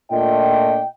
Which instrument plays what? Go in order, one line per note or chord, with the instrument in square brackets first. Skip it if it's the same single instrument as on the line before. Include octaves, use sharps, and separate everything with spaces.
[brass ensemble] A#2 A3 D4 F4 D#5 G5